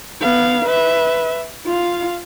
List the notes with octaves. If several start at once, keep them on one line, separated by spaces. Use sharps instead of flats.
B3 F5
B4 E5
F4 F5